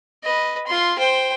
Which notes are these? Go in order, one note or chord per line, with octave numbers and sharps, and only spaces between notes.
B4 D#5
F4 C6
C5 G5